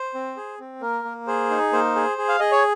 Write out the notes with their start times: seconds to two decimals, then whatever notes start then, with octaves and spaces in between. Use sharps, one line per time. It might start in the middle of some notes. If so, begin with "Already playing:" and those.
Already playing: C5
0.14 C4
0.37 G#4
0.59 C4
0.81 A#3 A#4
1.05 A#3
1.27 G#4 C5
1.50 D#4
1.73 A#3 C5
1.96 G#4
2.18 G#4
2.28 F5
2.39 G#4 D#5
2.51 C#5